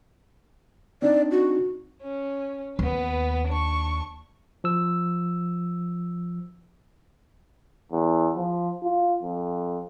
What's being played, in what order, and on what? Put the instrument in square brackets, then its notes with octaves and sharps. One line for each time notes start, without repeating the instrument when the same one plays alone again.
[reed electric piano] C4 D4 D#4 [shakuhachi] D5
[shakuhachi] F#4
[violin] C#4
[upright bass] D#2 [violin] B3 B4
[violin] D4 C#6
[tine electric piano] F3 E6
[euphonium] E2
F3
F4
F2